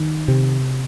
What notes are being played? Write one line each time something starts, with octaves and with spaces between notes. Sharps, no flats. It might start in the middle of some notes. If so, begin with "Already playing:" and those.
Already playing: D#3
C3